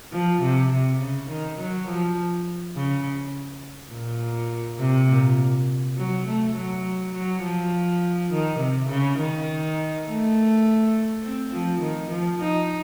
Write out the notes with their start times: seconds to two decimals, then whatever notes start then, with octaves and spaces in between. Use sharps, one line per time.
0.12 F3
0.42 C3
0.72 C3
1.00 C#3
1.30 D#3
1.59 F#3
1.88 F3
2.75 C#3
3.93 A#2
4.80 C3
5.09 A#2
5.98 F#3
6.27 A3
6.55 F#3
7.14 F#3
7.43 F3
8.31 D#3
8.59 C3
8.89 C#3
9.19 D#3
10.06 A3
11.23 C4
11.53 F3
11.81 D#3
12.11 F3
12.41 D#4